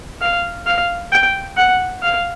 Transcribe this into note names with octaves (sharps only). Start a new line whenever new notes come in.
F5
F5
G5
F#5
F5